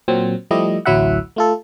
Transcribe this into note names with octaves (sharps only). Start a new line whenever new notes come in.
A#2 F#3 C4
F3 G3 A3 E4 G4 D#5
A1 D2 F#3 E4 E5 F#5
A3 F4 A4